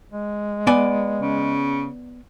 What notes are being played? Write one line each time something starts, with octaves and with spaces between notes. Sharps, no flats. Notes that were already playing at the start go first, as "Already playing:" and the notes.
G#3
B3 D5 G#5
C#3